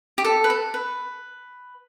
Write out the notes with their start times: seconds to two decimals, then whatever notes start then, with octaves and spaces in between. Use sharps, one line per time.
0.18 G4
0.25 A4
0.44 B4
0.50 A4
0.74 B4